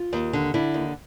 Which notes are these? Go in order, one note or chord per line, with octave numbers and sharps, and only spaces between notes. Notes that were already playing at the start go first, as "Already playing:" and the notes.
Already playing: F4
D#2
D3
D3 E4
D#2